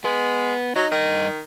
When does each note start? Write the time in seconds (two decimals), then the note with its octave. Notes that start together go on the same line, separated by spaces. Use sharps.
0.05 G#3 B3
0.76 F#3 D#4
0.92 G2 D#3 D#5